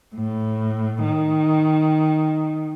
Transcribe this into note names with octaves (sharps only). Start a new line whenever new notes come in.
A2
D#3